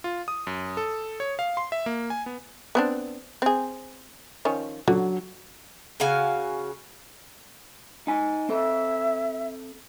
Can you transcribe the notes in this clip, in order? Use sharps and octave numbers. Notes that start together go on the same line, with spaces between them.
F4
D#6
F#2
A4
C#5
F5
C6
E5
A#3
G#5
B3
B3 C4 D4
C4 G#4
D#3 F3 C#4
D3 F#3
C#3 F#4 F5 G#5
D#4 G#5
C4 A4 E5